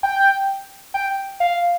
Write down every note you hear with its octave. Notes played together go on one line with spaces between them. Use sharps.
G5
G5
F5